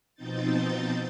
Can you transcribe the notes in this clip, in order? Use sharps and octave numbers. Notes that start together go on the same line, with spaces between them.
B2 F3 C4 D#4 G6 A6